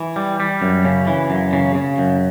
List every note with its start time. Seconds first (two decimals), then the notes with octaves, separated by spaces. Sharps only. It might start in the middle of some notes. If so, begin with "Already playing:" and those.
Already playing: E3
0.16 G3
0.40 G3
0.62 F#2
0.85 C#3
1.07 E3
1.30 F#2
1.53 C#3
1.75 C#3
1.98 F#2